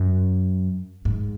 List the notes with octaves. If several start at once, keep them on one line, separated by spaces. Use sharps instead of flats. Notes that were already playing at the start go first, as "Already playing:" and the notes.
Already playing: F#2
G#2